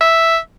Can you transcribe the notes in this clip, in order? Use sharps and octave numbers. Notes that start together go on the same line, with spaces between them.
E5